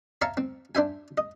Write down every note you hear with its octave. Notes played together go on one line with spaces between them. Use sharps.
C#5 E5 F5 A5 A#5 C#6
C4
D4 C5 E5 G#5
D#5